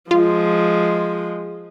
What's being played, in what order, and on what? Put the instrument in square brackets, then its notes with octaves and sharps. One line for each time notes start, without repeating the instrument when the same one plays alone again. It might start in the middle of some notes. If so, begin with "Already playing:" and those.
[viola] F3 G#3 [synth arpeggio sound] F4